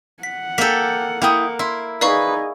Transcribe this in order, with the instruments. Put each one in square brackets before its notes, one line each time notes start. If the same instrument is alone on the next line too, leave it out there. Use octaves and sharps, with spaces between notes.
[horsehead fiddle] F#5 [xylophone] B6
[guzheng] A#3 A4 [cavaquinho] D5 G5 [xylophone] B6
[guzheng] A#3 [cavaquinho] E4 G5 D#6
[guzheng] E4 [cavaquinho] C6
[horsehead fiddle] D#4 G#4 [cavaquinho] B4 B5 [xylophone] D5 F5 C#6